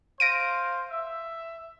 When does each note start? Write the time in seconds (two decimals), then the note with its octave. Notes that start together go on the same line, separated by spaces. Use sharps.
0.20 C5 F5 A#6 D7 D#7
0.91 E5